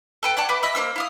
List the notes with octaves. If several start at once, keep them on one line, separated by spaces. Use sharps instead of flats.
A4 B4 G5
C#5 D5 F#5 A5
B4 E5 B5 D6
D#5 E5 B5
A#3 F4 C5 E6
E4 F5 D#6